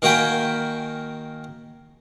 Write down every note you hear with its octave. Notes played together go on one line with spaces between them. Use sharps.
D#3 A#3 F#4 G5 G#5 B5